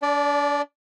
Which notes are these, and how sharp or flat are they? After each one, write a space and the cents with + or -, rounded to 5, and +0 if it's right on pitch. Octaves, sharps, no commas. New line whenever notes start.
D4 -35 D5 +0